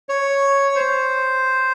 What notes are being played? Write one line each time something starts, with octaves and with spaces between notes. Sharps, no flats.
C#5
C5